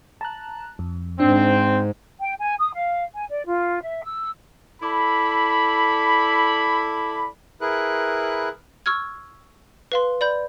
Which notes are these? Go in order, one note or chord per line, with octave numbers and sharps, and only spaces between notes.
A5 A#5 F#6
F2
G#2 C4 D4
G5
G#5
D#6
F5
G#5
D5
F4
E5
E6
E4 A4 D5 B5
E4 G#4 A#4 B4 F#6
C#6 E6 F6 G#6
B4 F5 C6
D5 B5 G6